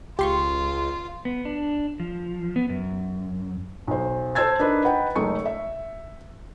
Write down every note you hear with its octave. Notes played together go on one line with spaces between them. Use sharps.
C#2 F4 G4 C6 C#6
B3
D4
F3
B3
F#2
B1 C5
A4 C5 A5 E6 G#6 A6
D4 D#4 A#4 B4
D#4 B4 F#5 G5
F#1 G#3 A3 D#4 C#6 C#7
E5